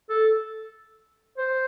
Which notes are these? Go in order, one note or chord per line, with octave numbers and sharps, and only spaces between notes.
A4
C5